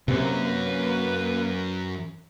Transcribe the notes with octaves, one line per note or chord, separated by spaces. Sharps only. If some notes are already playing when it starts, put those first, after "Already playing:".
F#2 C3 A#3 B4